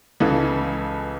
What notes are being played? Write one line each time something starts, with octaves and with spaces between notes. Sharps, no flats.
C#2 C#3 E3 A4